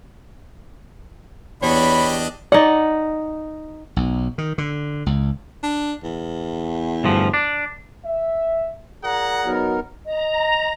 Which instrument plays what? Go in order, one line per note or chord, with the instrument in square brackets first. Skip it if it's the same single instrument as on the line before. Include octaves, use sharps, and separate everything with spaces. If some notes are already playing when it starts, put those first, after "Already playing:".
[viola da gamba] E2 [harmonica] D4 G4 D#5 [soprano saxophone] C#5 [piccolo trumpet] B5
[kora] D#4 F#5 [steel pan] D5
[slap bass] B1
D#3
D3
C#2
[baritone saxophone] D4
E2
[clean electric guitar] D2 G2 F3
D4
[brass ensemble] E5
[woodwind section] A#2 G#4 A#5 [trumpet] F#5
[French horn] F#3 [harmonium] B3 D#4 A#4
[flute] D#5 [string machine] A#5